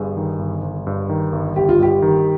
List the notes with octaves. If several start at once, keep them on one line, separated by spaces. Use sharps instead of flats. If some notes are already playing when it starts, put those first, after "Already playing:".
Already playing: G1 G2 G#4
D#3
G1
G1
G2
D#3
G1
G1 G4
F4
G2 G4
D#3